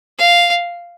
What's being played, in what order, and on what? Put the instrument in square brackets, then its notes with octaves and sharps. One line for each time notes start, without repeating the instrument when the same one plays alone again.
[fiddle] F5